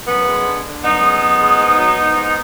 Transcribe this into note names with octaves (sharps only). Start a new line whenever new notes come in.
F#2 B3
G#3
D3
D3
F#2 B3 D#4
G#3
F#2
G#3
G#2
F#3
G#2
G#2